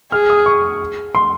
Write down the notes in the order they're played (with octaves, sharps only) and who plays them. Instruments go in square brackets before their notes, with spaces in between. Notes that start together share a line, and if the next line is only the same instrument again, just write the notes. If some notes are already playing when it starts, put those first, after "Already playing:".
[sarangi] G#4 [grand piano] F6
[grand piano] D#6
C#6
C6